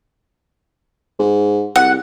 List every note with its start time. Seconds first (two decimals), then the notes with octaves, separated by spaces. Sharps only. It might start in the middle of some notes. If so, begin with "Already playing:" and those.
1.20 G#2
1.76 C2 F#5